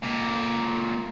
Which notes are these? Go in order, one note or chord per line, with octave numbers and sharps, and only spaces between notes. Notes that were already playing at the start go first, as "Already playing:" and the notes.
C#2 A#2